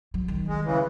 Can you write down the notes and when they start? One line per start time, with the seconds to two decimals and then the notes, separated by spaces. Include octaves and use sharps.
0.14 F#3
0.28 D#3
0.48 G#3
0.65 C#3 E3